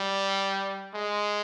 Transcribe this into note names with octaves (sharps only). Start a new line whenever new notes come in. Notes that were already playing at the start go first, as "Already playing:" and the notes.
Already playing: G3
G#3